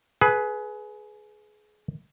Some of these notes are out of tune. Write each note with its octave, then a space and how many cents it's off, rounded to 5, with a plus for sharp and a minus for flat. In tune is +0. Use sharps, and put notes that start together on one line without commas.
G#4 +25 B4 +0